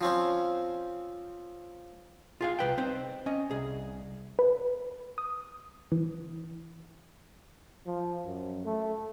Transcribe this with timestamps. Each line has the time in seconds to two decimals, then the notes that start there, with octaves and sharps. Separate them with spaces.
0.01 F3 C4 C#4
2.41 F4 G#4 F5
2.59 C2 E3 B4 G5
2.78 C4 D#4 C5
3.26 C#4 D#5
3.51 C2 G#4
4.39 B4
5.18 D#6
5.92 E3
7.86 F3
8.26 F#2
8.65 A3